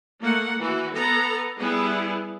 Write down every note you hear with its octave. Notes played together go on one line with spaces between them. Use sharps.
A3 A#3 F#5
E3 F#4
B3 A4 A#5
G3 B3 E4 G#4